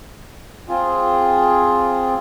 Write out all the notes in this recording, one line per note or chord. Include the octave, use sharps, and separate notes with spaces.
C4 F4 G#4